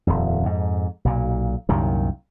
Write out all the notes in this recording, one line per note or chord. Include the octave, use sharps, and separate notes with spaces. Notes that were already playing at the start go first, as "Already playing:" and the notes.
D#1 F2
F2 G#2
B1 A#2
C2 F#2 A#2 D#3